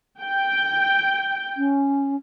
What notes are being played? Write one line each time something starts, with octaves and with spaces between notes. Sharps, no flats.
G5
C#4